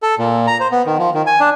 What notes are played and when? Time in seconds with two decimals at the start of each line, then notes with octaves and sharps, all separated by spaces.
0.03 A4
0.19 A#2
0.47 A#5
0.60 C5
0.72 B3
0.86 D#3
0.98 F3
1.14 D#3
1.27 G#5
1.40 D4